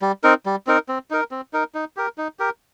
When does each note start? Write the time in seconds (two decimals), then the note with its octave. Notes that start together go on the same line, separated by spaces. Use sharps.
0.02 G3
0.23 C4 D#4 A#4
0.46 G3
0.67 C4 D#4 A#4
0.88 C4
1.11 D#4 A#4
1.31 C4
1.53 D#4 A#4
1.75 D#4
1.97 G4 A#4
2.18 D#4
2.39 G4 A#4